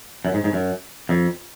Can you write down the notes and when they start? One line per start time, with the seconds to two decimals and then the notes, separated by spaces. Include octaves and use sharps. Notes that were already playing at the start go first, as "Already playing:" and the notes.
0.25 F#2
0.34 G#2
0.44 G#2
0.53 F#2
1.09 F2